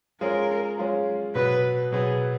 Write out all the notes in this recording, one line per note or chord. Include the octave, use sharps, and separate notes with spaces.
G#3 C#4 F4 G#4 A#4
G#3 C#4 F4 G#4
B2 F#3 B3 B4
B2 F#3 B3 G#4